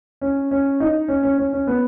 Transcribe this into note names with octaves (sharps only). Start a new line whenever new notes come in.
C#4
C#4
D#4
C#4
C#4
C#4
C#4
B3